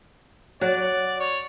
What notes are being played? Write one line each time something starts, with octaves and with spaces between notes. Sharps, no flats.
F#3 F#4 D5
C#5